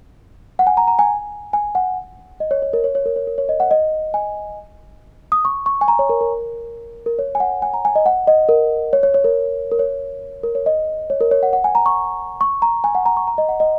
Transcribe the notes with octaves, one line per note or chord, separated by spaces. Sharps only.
F#5
G#5
A#5
A#5
G#5
G#5
F#5
D#5
C#5
C#5
A#4
C#5
C#5
A#4
C#5
A#4
C#5
D#5
F#5
D#5
G#5
D#6
C#6
C#6
G#5
A#5
C#5
A#4
A#4
A#4
C#5
G#5
F#5
G#5
A#5
G#5
D#5
F#5
D#5
A#4
C#5
C#5
C#5
A#4
A#4
C#5
A#4
C#5
D#5
C#5
A#4
C#5
F#5
F#5
G#5
A#5
C#6
C#6
A#5
G#5
F#5
A#5
C#6
A#5
D#5
F#5
D#5